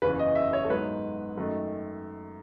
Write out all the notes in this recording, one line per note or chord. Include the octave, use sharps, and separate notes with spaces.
F#1 E2 C#3 E3 B4
D#5
E5
C#5
A4
G#2 F#3 B3 D#4 B4
F#2 D#3 A3 D#4